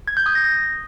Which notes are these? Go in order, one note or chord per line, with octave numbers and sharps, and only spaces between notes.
G#6
G6
D#6
A#6